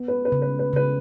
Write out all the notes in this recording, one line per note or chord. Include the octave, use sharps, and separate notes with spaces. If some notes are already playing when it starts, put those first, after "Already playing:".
Already playing: B3
B4
B4
C#3
B4
B4
C#3 B4